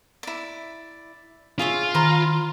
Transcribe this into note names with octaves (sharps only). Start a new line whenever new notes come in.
E4 D5
F4 G#4 C#5 E5
D#3 C5 A#5 B5